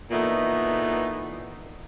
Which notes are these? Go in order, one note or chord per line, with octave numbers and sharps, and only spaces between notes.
A#2 E3 A3 B3 D#4